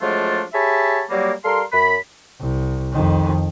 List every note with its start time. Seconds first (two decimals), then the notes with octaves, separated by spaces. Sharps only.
0.02 F3 F#3 G#3 A3 D4 F4
0.54 G4 G#4 C#5 E5 A5 B5
1.10 F#3 G3 A#3
1.45 G3 A4 A#4 F5 C6
1.73 F#2 B5
2.40 C2
2.93 F2 D#3